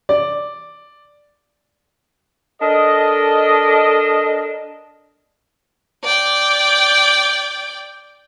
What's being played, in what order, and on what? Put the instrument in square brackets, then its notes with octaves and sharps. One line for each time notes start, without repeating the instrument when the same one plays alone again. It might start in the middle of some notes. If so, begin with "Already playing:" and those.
[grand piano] D5
[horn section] D4 A4 A#4 D#5
[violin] D5 G5